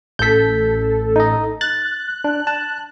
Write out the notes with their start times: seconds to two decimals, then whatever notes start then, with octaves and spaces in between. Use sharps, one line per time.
0.19 A1 A4 G6 B6
1.16 D#4 D#5
1.61 F#6 A6
2.24 D4
2.47 A5